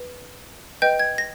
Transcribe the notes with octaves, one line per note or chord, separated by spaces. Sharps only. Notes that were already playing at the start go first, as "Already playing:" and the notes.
Already playing: B4
B4 D#5 G5 G6
G#6
A#6